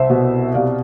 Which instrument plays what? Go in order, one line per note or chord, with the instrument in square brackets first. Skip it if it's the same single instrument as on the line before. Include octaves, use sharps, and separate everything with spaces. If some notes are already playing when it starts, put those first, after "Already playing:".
Already playing: [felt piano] C2 C5 E5
B2
C3 D5 F5